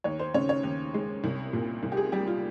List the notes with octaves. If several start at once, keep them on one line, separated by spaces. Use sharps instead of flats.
D#2 C#5
C5
C#3 C#5
C#5
D#2
G#3
C2
A#2
C2
G4
G#4
G3 G4
F4